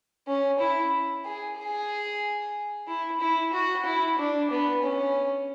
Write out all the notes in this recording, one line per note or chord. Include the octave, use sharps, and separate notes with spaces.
C#4
E4
G#4
G#4
E4
E4
F#4
E4
D4
B3
C#4